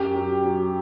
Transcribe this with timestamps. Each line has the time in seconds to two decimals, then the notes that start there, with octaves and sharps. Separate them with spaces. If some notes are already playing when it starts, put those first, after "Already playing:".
Already playing: F#2 G4
0.16 F#3
0.44 F#3